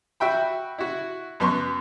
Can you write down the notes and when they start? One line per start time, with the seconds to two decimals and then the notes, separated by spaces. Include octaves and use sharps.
0.20 F#4 E5 G5 B5
0.78 E4 F#4
1.40 F#2 B3 C6 C#6